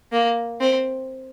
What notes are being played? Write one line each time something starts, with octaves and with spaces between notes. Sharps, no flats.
A#3
C4